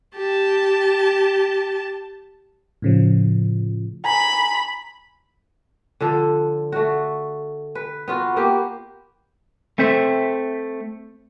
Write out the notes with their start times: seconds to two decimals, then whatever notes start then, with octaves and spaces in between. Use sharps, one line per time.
0.14 G4 A5
2.82 A2 C#3 F3
4.05 G#5 A#5 B5
6.01 D3 F3 A4
6.72 A3 F#4
7.75 B4
8.08 B3 F4 F#4
8.37 A#3 B3 G4
9.78 A3 C4 C5 E5